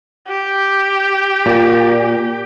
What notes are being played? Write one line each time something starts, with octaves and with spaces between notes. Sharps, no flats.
G4
A#2